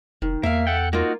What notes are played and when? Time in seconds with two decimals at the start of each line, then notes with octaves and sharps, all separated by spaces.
0.22 F1 D#3
0.43 E2 A#3 E5 F5
0.67 A4 F#5 G5
0.93 A#3 D#4 F4 F#4